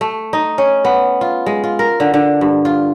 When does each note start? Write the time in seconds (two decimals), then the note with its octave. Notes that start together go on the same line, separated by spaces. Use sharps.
0.01 A3
0.33 D#4
0.58 C#4
0.85 B3
1.21 F4
1.46 G#3
1.64 F4
1.79 A#4
2.00 D3
2.14 D3
2.41 G2
2.65 F4